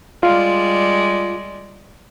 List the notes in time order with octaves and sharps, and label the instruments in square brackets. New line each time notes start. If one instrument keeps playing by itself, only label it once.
[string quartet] G3 G#3 D5 [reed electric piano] F4